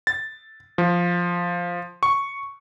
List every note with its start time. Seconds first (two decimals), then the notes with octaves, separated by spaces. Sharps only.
0.07 A6
0.78 F3
2.03 C#6